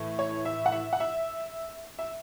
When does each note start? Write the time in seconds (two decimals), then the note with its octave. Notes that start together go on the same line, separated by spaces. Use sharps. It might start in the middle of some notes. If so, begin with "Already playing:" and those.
Already playing: A2 E3 A3
0.19 C#5
0.45 E5
0.66 F#5
0.72 E5
0.93 F#5
1.00 E5
1.99 E5